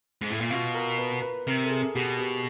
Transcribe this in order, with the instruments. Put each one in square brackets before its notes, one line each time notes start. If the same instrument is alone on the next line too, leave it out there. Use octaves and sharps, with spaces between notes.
[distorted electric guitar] G#2
A2
A#2
[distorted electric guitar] B2 [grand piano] F4
[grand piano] A#4
B4
B4
[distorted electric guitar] C3 [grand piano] A#4
[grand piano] A4
G#4
[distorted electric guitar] B2 [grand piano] G4
[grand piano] G4